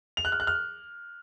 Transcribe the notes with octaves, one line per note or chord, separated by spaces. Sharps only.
F7
F#6
F6
F#6
F6